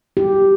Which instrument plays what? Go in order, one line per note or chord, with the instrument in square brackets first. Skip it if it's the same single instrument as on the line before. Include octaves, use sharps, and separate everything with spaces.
[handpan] G4